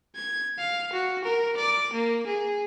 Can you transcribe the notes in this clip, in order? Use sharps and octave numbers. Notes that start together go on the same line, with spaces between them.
G#6
F5
F#4
A#4
D5
A#3
G#4